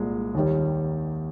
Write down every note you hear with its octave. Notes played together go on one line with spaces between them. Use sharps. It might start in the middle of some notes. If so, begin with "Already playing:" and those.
Already playing: C2 A#2 G#3
D#2 D#3 G3